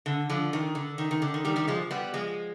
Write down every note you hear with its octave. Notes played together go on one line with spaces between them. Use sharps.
D3
D3 F3
D#3
D3
D#3
D#3
D3
D#3
D#3 G3
D#3 G3
F3 G#3
G3 B3
F3 G#3